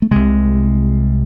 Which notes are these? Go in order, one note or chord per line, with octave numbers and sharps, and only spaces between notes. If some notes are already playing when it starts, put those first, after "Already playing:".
A3
C2 C3 G#3